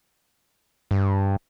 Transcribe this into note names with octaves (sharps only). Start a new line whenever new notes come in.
G2